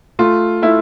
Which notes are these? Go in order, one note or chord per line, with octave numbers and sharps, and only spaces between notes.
A3 F4
A3 E4